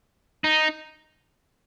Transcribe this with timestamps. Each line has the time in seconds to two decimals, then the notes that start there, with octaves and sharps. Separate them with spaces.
0.44 D#4